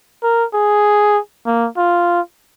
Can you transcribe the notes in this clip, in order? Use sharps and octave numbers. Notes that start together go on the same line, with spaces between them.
A#4
G#4
A#3
F4